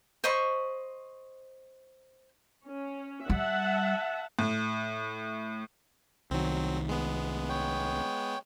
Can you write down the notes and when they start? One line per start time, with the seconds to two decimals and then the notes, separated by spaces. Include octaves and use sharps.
0.24 C5 D#5 B5 C#6
2.67 C#4
3.30 G3 E5 F#5 A5
4.39 A2
6.31 C2 D#3 F#3 C4
6.89 G#3 B3
7.49 C#5 G5